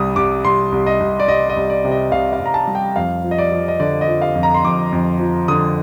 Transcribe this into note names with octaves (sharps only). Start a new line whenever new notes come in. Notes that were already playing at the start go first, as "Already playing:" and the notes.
Already playing: C2 G3 D#6
C2 D6
C2 C6
C2
D#5
C2
D5
C2 D#5
D#5
C2
D5
C3
D#5
C2 F5
F5
C2
A#5
A5
G3
G5
F2 F5
F3
D#5
D5
F3
D#5
D3 D5
D#5
F3
F5
F2
A#5
C6
F2 D6
F2
F3
D3 D#6